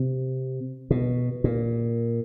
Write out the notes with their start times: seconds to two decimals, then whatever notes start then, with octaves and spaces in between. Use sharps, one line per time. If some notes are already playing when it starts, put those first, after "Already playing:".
Already playing: C3
0.91 B2
1.44 A#2